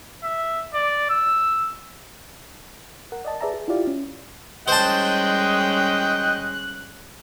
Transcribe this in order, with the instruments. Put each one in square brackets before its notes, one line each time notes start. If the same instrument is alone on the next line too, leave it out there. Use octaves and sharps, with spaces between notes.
[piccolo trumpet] E5
D5
E6
[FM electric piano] A#4 F#5
D5 D#5 A5
G#4 B4 D5 E5 A5 A#5
G#4
E4 F4 G4 D5 F5
C#4
[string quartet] G3 G#3 C#4 [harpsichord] C5 A5 [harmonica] D#5 G5 [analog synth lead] F#6